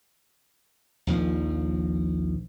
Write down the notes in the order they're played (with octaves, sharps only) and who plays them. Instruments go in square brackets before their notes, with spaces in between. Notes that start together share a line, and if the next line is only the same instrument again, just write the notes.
[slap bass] A#1 D#2 F3